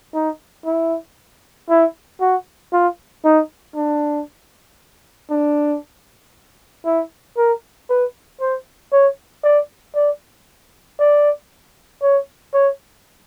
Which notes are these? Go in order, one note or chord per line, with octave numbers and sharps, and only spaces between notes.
D#4
E4
E4
F#4
F4
D#4
D4
D4
E4
A#4
B4
C5
C#5
D5
D5
D5
C#5
C#5